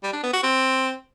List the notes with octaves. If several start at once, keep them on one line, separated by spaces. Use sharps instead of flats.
G3
D4
B3
F#4
C4